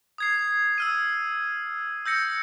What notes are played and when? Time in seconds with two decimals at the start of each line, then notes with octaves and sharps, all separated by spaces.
0.18 D#6 G#6 C7
0.78 E6 F6 D#7
2.06 E6 G6 A#6 C#7